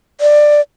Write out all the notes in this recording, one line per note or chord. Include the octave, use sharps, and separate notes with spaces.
D5